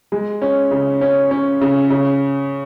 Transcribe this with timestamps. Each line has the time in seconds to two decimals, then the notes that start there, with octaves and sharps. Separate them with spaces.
0.12 G#3
0.42 C#4
0.71 C#3
1.01 C#4
1.31 C#4
1.61 C#3
1.90 C#3